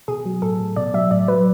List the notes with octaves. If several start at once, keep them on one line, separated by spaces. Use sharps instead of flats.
B2 G#4
F#3
A2 A4
A2
B2 D5
F#3 E5
A2 D5
F#3 B4